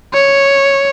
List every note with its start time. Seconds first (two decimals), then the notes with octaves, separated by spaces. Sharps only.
0.14 C#5